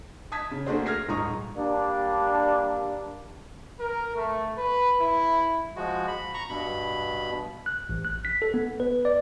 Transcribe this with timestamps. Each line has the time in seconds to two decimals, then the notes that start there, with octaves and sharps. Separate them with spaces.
0.32 A5 D#6 G#6 B6
0.51 C#3
0.66 A3 A#3 D4 F#4 G#4 C5
0.86 F6 G#6 A#6 C7
1.08 D#1 G#2 A#5 C#6 D#6
1.57 G3 A#3 D4
3.80 A#4
4.15 A3
4.58 B4
5.00 E4
5.76 F3 G#3 F#4
6.08 B5
6.34 A#5 C#6
6.49 G2 B2 B5
7.66 F#6
7.89 A1
8.05 F#6
8.25 B6
8.42 A4
8.54 B3
8.80 B4
9.05 D5